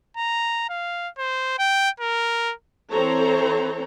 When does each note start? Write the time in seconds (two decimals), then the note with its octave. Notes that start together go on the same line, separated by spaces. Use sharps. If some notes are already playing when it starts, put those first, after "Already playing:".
0.17 A#5
0.70 F5
1.18 C5
1.58 G5
2.00 A#4
2.91 E3 C4 A4 C5 C#5 A#5